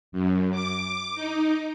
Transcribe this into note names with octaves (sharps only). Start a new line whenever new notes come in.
F#2
D6
D#4